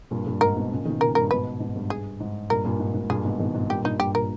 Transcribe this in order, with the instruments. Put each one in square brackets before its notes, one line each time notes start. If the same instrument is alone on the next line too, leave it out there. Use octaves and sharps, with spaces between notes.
[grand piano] G2 A#2
G2 A#2
[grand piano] G#2 [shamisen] A#4
[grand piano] G#2 B2
A#2 C#3
B2 D#3
[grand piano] A#2 C#3 [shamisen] A#4
[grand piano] G2 A#2 [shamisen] A#4
[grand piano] G#2 B2 [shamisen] B4
[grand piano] G#2
G2
[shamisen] G#4
[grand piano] G#2
[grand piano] G2 A#2 [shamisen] A#4
[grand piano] G2 A#2
G#2
G#2
[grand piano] G2 A#2 [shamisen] G#4
[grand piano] G#2 B2
B2 D#3
G#2 B2
[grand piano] G2 A#2 [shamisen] G4
[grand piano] G2 A#2 [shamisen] D#4
[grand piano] G2 [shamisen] G4
[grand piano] A#2 [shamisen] A#4